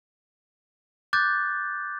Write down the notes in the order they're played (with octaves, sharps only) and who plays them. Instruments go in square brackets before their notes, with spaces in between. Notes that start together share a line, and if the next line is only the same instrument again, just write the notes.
[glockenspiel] D6 F#6 G6 A6